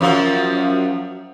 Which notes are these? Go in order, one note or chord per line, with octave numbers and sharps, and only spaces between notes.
F#2 F3 F#3